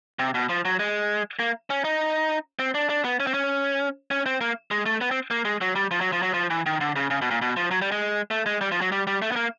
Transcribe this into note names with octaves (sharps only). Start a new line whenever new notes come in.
C3
B2
F3
F#3
G#3
A#3
C#4
D#4
C4
D4
D4
B3
C#4
C4
C#4
C#4
C4
A#3
G#3
A3
B3
C4
A#3
G#3
F#3
G3
F3
F#3
F3
F#3
F3
E3
D#3
D3
C#3
C#3
B2
A#2
B2
F3
F#3
G3
G#3
A3
G#3
G3
F3
F#3
G3
G3
A3
B3
A#3